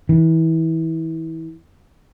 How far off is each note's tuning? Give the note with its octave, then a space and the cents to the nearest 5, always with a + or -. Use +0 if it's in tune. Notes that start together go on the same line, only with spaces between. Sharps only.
E3 -30